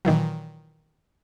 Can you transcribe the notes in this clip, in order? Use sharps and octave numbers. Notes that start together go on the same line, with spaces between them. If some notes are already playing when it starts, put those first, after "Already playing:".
A#2 D#3 E3 F#3